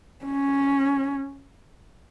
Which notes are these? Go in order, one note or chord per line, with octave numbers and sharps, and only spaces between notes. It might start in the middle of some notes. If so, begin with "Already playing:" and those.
C#4